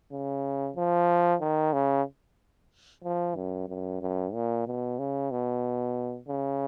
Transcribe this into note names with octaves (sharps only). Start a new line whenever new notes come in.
C#3
F3
D#3
C#3
F3
F#2
F#2
F#2
A#2
B2
C#3
B2
C#3